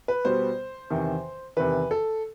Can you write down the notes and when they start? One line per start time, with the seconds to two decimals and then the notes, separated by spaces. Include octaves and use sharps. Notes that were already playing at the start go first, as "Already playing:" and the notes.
0.08 B4
0.25 B2 G3 B3 C5
0.90 E2 C3 D#3
1.57 E2 C3 D#3 B4
1.91 A4